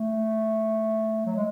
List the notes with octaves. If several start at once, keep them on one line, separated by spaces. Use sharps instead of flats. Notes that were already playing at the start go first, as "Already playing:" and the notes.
Already playing: A3
F#3
G#3